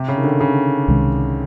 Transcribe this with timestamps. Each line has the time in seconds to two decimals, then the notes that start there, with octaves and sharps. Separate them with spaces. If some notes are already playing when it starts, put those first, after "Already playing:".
Already playing: C3
0.08 C#3
0.17 D#3
0.24 D3
0.41 C#3
0.88 C2 C3 D#3 G#3